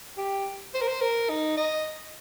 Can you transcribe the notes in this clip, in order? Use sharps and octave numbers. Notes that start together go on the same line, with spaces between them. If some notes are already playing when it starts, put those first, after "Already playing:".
G4
C5
A#4
C5
A#4
D#4
D#5